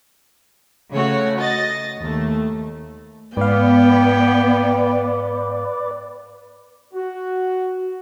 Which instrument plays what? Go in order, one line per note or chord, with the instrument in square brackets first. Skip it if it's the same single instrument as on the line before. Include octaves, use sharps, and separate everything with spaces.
[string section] C#3 A3 F#4 C#5
D#5 A6
D#2 A3
[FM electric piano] G#2 F5 [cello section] B3 [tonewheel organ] B4 D5 [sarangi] G5
[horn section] F#4